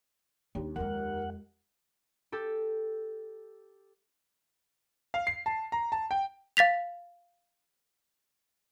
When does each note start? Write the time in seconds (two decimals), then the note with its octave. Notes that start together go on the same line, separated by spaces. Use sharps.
0.55 D#2 D4
0.76 F2 G#3 A#4 F#5
2.32 G4 A4
5.14 F5
5.27 C7
5.46 A5
5.72 A#5
5.92 A5
6.11 G5
6.57 F5 A6 B6 F7